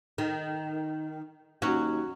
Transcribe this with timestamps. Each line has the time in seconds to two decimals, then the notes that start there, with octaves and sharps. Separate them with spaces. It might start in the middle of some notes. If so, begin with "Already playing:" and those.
0.18 D#3
1.62 D#2 F#3 C#4 F#4